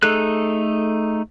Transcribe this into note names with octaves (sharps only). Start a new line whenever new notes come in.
A3 D#4 G#4 A4 F#6